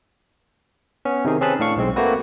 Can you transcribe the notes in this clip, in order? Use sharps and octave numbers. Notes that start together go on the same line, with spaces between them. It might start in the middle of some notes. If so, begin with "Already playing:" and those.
B3 C#4
C3 D#3 D#4 G#4
C4 C#4 G#4 B4 A5 B5
A2 D4 F5 C#6
B1 G#3 C4
A3 A#3 C4 F#4 B4